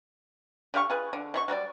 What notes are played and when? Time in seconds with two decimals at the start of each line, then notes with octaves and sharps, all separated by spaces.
0.74 D3 G4 F5 C#6
0.90 F4 G#4 B4
1.13 D3
1.34 B2 E4 C#6
1.48 F#3 G3 B4 D5